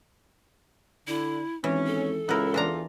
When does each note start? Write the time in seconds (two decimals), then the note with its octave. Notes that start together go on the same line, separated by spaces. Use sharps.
1.08 D3 E4
1.64 G#1 E3 C#4
1.87 A4
2.29 C#2 B3 E4 A#4
2.54 E2 E3 D4 F4 A#5